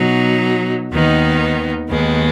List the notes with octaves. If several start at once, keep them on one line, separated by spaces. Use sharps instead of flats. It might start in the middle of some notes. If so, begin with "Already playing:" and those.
Already playing: B2 F#3 D#4
D#2 D#3 B3 D#4
D#2 D#3 G#3 B3